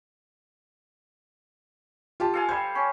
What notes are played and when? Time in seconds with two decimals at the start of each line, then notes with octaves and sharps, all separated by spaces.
2.20 F4 G4 A5
2.34 A4 F5 G#5
2.49 G3 C5 G#6
2.75 C#4